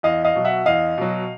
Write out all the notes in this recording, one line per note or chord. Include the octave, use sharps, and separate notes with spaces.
E2 D#5 F5
D#5 F5
B2 F#3
E5 F#5
E2 D#5 F5
B2 F#3